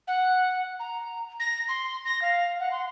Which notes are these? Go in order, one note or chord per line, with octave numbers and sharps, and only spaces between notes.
F#5
A#5
A#6
C6
A#6
F5
F#5
C6